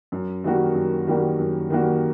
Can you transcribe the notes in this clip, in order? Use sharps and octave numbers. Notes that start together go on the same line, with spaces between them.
F#2
D#3 G3 A#3 F#4
F#2
D#3 G3 A#3 F#4
F#2
D#3 G3 A#3 F#4